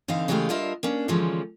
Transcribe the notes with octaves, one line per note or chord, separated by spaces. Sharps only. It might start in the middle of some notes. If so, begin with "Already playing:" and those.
D3 E3 C4 D#4 F5
C#3 E3 G#3 A3 G4 F5
G3 D4 F4 A#4 D#5 E5
A#3 C#4 D4
D3 E3 F3 G3 G#3 C#4